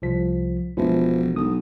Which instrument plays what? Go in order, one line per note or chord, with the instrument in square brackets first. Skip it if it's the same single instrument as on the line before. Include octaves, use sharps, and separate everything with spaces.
[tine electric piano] C2 F3 B6
[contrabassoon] E1 [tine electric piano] E3 F3 E4
[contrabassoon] B1 [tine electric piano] D#6